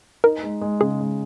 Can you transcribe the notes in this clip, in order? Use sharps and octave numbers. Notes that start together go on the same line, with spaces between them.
D#4 A#4
G#3
G#3
C#3 G#4
G#3